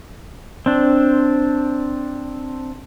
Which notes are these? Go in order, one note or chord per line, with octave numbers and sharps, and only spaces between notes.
C4 D4